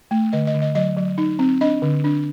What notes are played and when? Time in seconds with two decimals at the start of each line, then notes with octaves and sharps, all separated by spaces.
0.11 A3
0.33 D3 D#5
0.47 D#5
0.54 D3
0.62 D#5
0.75 F#3 D#5
0.97 F#3
1.18 D#4
1.39 C4
1.61 D4 D#5
1.82 D3
2.04 D4